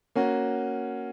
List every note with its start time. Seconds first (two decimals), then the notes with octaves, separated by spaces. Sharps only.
0.15 A#3 C#4 F#4